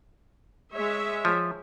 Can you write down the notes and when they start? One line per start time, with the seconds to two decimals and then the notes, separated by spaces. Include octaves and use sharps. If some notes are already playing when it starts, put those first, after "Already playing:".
0.72 G#3 C#5 E5
1.25 F3